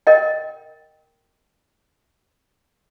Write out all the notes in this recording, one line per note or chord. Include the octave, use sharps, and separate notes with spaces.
A#4 D#5 G5